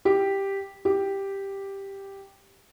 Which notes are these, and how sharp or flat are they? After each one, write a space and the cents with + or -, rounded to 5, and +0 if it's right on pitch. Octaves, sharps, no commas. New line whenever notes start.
G4 +0
G4 +0